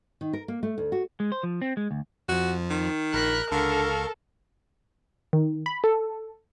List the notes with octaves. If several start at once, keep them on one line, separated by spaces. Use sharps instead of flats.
D#3
A#4
A#3
A3
D2
F#4
G#3
C5
F3
C4
G#3
D2
F2 F3 F#4
D#3
A#1 A#4 B5 F#6 B6
C#2 D3 A4 A#4 F5 C#6
D#3
B5
A4